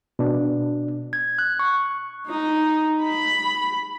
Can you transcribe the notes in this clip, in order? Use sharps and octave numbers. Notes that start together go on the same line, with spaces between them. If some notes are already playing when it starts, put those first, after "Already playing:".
B2 D4
G#6
F#6
C#6
D#4
B5